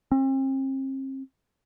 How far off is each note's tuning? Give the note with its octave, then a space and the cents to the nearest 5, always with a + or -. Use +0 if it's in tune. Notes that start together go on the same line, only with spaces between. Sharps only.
C4 +40